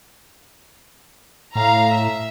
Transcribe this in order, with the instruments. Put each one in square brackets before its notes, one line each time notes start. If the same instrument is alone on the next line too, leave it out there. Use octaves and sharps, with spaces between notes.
[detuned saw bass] A2 [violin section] F5 A#5
[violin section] E5